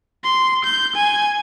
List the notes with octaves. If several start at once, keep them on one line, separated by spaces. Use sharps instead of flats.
C6
G6
G#5